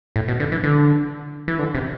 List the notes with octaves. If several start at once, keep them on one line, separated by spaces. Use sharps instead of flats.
A2
B2
D3
E3
D3
E3
D3
C3